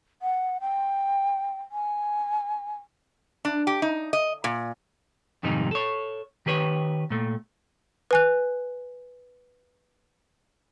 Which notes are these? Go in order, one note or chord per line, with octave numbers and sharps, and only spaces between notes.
F#5
G5
G#5
D4
G4
D#4
D#5
A#2
F2 G#2 C3 D#3 G3 D#4
A4 C#5
D#3 G4 B4 C#5
A#2 A3
B4 G#5 F#6